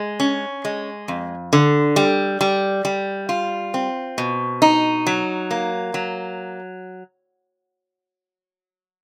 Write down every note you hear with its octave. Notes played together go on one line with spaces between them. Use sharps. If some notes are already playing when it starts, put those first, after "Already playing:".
Already playing: G#3
C#4
G#3
F2
D3
G3
G3
G3
F4
C4
B2
D#4
F#3
A#3
F#3